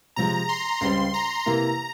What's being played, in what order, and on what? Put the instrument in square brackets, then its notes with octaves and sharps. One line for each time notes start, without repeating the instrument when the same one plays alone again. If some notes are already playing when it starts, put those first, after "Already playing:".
[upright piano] C3 F3 G#3 [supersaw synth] A#5
[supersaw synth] C6
[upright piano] C#2 C#3 G3 C4 [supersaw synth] C6
[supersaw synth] A#5
[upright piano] C3 E3 A#3 E4 [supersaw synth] A#5